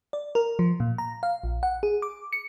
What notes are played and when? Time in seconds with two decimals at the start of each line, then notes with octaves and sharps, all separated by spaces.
0.13 D5
0.35 A#4
0.59 F3
0.80 A#2
0.98 A#5
1.23 F5
1.44 A#1
1.63 F#5
1.83 G#4
2.02 D6
2.33 C#7